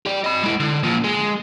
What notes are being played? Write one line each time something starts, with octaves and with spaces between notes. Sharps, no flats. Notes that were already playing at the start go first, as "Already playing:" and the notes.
G4 D5
D#5 B5
G#3 E4
D3
A#2 F3
G#3